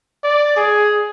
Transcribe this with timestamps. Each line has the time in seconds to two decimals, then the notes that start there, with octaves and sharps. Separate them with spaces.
0.23 D5
0.56 G#4